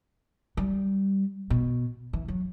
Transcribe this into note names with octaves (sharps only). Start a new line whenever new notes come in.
G3
B2
E3
F#3